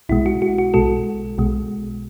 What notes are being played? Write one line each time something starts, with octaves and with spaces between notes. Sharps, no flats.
B1 B2 G#3 E4
F#4
F#4
F#4
B1 B2 G#3 F#4 A4
B1 B2 G#3